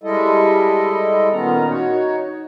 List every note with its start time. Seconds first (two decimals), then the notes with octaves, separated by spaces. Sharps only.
0.03 G3 G#3 E4 A4 D#5
1.32 A#2 D#3 B3 C#4 A#5
1.68 D#4 F#4 C#5